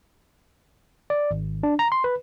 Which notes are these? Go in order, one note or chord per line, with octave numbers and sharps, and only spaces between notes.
D5
G#1
D4
A#5
C6
B4